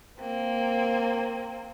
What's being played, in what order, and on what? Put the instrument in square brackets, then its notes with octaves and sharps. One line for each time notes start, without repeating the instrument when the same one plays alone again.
[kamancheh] A#3 C4